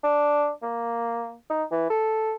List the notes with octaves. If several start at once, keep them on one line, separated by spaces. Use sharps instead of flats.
D4
A#3
D#4
E3
A4